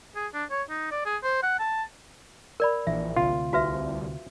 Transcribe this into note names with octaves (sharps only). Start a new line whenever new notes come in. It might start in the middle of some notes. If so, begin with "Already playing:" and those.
G#4
D4
C#5
D#4
D5
G#4
C5
F#5
A5
A#4 D5 B5
A#1 E3 E5
D2 C3 F4
C2 F#4 B4 E5